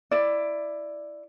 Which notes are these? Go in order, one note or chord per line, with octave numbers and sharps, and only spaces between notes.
E4 D5